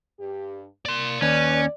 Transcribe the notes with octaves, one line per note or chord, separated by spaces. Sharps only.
G2 G4
A#3 D5 C6
D#2 C#4 B4 D5